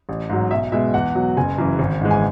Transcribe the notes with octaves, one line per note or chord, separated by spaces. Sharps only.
A1
G#2 F#3
B1 E5
B2 G#3 E5
E2 F#5
B2 F#3
F#1 G#5
F#2 C#3 E3
G#1
G#2 E3 G#3
G#5